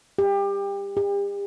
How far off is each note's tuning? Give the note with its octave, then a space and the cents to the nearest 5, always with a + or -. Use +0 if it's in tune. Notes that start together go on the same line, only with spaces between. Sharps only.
G4 +25
G4 +40